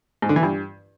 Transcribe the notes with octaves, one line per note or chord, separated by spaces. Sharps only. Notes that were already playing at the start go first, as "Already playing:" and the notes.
G#2
D3
E3
G2